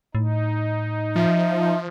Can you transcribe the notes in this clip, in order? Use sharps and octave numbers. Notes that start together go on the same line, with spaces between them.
A2 D#4
F3 E5